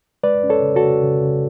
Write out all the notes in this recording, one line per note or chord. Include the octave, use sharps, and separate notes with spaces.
G#3 B4 D5
C#4
A4 C#5
C#3
F#4 A4
C#3
C#3
C#3